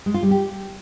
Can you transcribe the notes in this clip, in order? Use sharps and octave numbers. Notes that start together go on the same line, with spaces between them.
G#3
F4
G3
G4